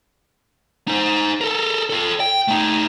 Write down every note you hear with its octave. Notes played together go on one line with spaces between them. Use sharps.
D#4 C5
A4 A#4
F4 A4
G5
A3 D#4